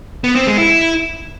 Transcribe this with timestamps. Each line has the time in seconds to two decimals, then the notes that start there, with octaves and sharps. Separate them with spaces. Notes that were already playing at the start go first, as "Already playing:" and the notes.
0.24 B3
0.35 C4
0.47 G#3
0.58 E4